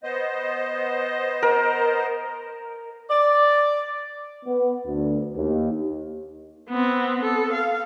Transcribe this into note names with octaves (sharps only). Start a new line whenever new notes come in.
B3 C5 D#5
A#4
D5
B3
D2
D#2
B3 C4
A4
F5